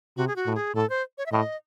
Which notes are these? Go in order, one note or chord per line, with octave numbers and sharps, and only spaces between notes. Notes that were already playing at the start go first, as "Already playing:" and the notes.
C3 F#4
G#4
F#4
A2
G#4
A2 A4
C5
C#5
E5
A2 D#5